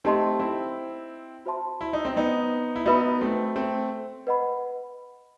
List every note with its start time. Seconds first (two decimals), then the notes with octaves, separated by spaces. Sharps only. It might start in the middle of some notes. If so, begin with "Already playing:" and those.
0.04 A3 C4 D#4 G4 D#5 A5 C6
0.40 C4 E4
1.46 F#4 C5 E5 A5 C6
1.81 E4
1.93 D#4
2.05 C4
2.16 B3 D#4
2.76 E4
2.85 B3 D#4 F#4 B4 E5 B5
3.21 A3 C4
3.56 A3 C4
4.27 B4 D#5 F#5 B5